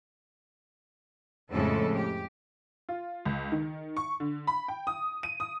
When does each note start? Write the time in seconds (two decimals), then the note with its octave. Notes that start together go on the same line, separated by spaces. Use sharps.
1.52 F2 A2 C#3 G#3 A4
1.96 G4
2.89 F4
3.26 C#2
3.52 D#3
3.97 C#6
4.20 D3
4.47 B5
4.68 G5
4.87 D#6
5.23 D#7
5.40 D#6